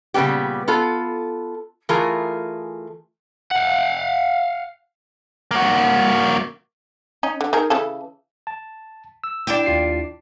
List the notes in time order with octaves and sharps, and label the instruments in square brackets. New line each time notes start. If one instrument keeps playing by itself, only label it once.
[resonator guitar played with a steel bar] A#2 C#3 G3 B3 G4
B3 F4 A4
E3 A3 F4 G#4 A#4
[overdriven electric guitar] F5 F#5
[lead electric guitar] A#3 F#4
[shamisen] C#4 D#4
D3
D#4 G#4 A#4
C#3 E3 A4
[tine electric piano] A5
E6
[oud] D4 E4 G4
[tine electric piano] D#2 F4 C7